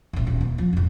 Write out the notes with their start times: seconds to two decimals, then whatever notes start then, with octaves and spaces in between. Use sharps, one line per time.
0.13 D#1 A2
0.27 D#1
0.41 B3
0.58 F3
0.73 F2 G#2